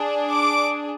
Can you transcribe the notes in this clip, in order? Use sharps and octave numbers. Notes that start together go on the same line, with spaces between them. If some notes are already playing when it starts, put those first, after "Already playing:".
Already playing: D4 G#4
D6